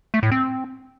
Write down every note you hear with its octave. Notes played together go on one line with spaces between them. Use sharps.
A3
A2
C4